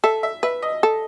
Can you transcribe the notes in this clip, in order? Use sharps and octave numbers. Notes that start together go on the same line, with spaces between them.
A4 E5
E5
B4 E5
D#5
A4